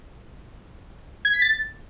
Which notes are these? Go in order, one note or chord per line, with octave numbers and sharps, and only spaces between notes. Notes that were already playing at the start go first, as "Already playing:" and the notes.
G#6
B6
A6